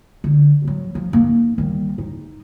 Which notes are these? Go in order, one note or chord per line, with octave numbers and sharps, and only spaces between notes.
D3
F3 F#3
F3
A#3 D#4
D#3 G3
D#4